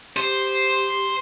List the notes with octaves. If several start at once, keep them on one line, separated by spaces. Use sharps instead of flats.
G4 C5